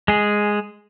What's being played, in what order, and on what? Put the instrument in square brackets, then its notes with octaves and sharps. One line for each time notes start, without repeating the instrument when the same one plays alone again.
[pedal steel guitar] G#3 G#4